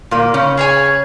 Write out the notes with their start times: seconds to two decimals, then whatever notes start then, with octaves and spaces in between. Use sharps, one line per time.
0.11 A#2 A#3
0.34 C#3 C#4
0.57 G#4 C#5 G#5